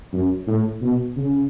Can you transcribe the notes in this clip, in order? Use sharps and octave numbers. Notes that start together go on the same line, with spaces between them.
F#2
A2
B2
C#3